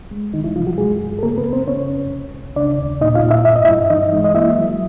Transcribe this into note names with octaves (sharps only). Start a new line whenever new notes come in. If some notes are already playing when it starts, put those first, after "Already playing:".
G#3
D2 D#3 D#4
E3 E4
C3 F3 F4
F#3 F#4
G2 G#3 G#4
G2
A4
C#3 A#3 A#4
B3 B4
F#2
C4 C5
C#3 C#4 C#5
F2
C2
C2
C#3 D4 D5
D#2
A#2 D#4 D#5
F4 F5
A#2
E4 E5
G2 E5
D#5
E4 E5
G2
E3 D#4 D#5
G#3
D#5
A#3 E4 E5
F#3